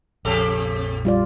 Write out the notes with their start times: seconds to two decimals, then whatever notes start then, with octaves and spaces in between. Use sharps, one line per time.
0.25 A#1 F2 C3 G4 A4
1.05 G3 F4 D5